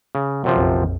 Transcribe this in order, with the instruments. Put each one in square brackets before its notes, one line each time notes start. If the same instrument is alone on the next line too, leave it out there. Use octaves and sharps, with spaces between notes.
[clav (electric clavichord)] C#3
F#2 C3 F3
[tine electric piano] A#1 F2